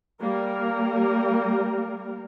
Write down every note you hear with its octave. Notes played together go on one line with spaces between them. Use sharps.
G3 A#3 A#4